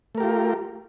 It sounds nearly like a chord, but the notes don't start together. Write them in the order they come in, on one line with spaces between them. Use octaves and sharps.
A3 A#4 G4 F4